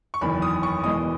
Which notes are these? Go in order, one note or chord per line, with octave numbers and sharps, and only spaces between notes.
C#6
F#1 E2 D#3 B5
D#6
C#6
E2 B2 G#3 D#6